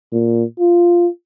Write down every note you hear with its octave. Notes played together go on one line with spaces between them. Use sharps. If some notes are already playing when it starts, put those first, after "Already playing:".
A#2
F4